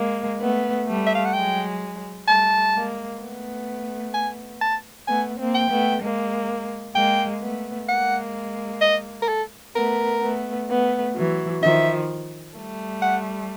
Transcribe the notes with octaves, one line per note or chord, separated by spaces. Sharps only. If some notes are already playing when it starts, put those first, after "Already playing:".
Already playing: G#3 A#3
A3 B3
G3 A3
E5
F5
F#5
F#3 G#3 G5
G3 A3 A5
G#3 A#3
A3 B3
G#5
A5
A3 B3 G#5
A#3 C4
G5
A3 B3
G#3 A#3
G#3 A#3 G5
A3 B3
G#3 A#3 F#5
D#5
A#4
A4
A3 B3 A#4
A3 B3
A3 B3
E3 F#3
D#3 F3 E5
G3 A3
F#5